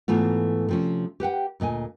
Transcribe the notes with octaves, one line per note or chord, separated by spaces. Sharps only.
G#2 E3 A3 B3 F4
C3 F3 C#4
G4 B4 F#5 G5
D2 A#2 D#5 G#5